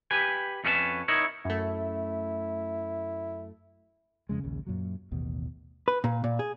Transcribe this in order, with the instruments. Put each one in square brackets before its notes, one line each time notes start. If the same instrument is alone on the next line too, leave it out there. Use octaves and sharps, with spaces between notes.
[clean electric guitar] G4 B4 G#5
F2 A3 C#4 A4 B4 A5
D#4 E4 A#4 C#5
[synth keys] F#2 A3 [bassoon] E4
[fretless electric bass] F2 C#3 G#3
A#1 D#2 C#3
F#2 A#2 F#3
A1 D#2 B2
[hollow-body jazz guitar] B4
A#2
A#2
G#4